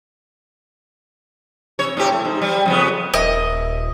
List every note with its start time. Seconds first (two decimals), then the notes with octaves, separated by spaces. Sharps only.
1.79 C3 C#5
1.97 A2 C3 G4
2.12 A3
2.25 G#2
2.42 G3
2.66 F2 C#3 B3
3.14 D#1 A#4 D#5 E5